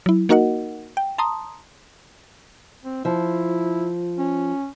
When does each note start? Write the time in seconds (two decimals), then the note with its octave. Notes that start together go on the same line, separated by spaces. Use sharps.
0.06 F#3 E4
0.29 A#3 D#4 F#4 A#4 D#5 F#5
0.97 G5
1.18 A5 A#5 C6 D#6
2.85 C4
3.05 F3 E4
4.18 C#4